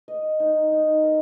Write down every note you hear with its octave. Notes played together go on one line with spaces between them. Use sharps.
D#5
D#4
D#4
A#4